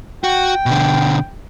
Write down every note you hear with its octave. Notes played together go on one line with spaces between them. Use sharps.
F#4 G5
B2 D3